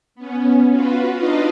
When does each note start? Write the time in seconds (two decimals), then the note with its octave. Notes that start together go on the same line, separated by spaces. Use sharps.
0.15 B3 C#4
0.70 F4 F#4 B4
1.15 D4 D#4 F4 B4 D#5 F5